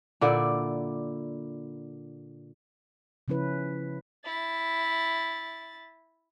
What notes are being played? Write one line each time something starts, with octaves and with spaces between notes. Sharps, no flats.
A#2 D3 E4 D5
C#3 F3 C#4 E4 B4
E4 A6